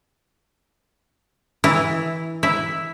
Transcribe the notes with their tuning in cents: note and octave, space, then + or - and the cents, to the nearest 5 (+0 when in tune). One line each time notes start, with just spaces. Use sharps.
E3 -15 E4 +0
E4 +0 E5 +0